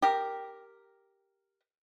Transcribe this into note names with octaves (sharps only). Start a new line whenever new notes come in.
G4 A#4